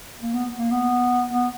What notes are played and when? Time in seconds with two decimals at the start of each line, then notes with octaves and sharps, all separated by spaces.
0.22 A#3
0.34 B3
0.58 A#3
0.71 B3
1.32 B3